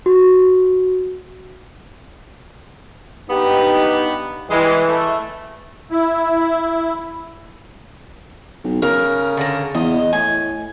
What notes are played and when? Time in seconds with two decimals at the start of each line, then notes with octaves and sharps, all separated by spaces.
0.06 F#4
3.30 G2 B3 D#4 G4
4.50 E3 G3 G#3
4.87 A3
5.91 E4
8.64 B1
8.82 C#3 A#4
9.37 D3 A#5
9.75 E2 D#5
10.13 A2 G#5